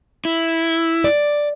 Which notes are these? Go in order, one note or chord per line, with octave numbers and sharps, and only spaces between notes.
E4
D5